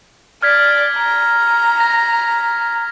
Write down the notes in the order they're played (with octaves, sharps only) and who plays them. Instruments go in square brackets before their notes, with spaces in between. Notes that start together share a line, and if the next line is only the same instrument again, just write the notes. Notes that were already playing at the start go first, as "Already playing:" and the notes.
[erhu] D5 [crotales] F6 G#6 B6
[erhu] A#5
[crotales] A#6